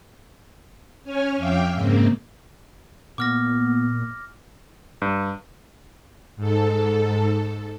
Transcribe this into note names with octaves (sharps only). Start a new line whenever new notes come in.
C#4 C#5 G#5 F6
F2 E5 F5 G5 D6
G#2 C#3 A#3 C4
A#2 B3 D6 F6 A#6
G2
G#2 A4